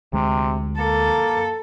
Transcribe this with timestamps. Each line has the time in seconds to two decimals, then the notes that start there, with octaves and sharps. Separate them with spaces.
0.13 D2 C3 G#3
0.79 A#3 A4